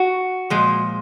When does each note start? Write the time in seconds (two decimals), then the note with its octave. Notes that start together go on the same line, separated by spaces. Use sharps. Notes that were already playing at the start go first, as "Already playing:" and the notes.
Already playing: F#4
0.50 A#2 F3 G#3